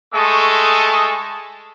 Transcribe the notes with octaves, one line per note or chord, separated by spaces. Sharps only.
G#3 A3 A4 C#6 D#6